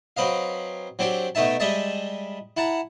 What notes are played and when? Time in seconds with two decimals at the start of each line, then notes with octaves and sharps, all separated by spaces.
0.17 F#3 C4 B4 D#5 F5
0.99 F#3 C4 D4 G4
1.35 B2 A3 D#4 E5 A5
1.60 G3 G#3 D#5 E5 A5
2.57 E4 F#5 A5 A#5